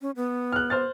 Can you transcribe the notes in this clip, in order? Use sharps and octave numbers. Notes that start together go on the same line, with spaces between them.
C#4
B3
F6 F#6
C5 F6 A6